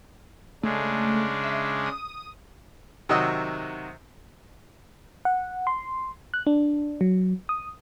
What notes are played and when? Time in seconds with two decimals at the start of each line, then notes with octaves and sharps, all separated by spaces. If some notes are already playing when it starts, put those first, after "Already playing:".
0.63 C#3 G#3 A3 D4
1.44 E5
1.86 D#6
3.09 C3 D#3 F#3 F#4 D#5 E6
5.25 F#5
5.67 C6
6.34 F#6
6.47 D4
7.01 F#3
7.49 D#6